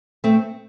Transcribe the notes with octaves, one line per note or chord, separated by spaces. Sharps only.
A3 C4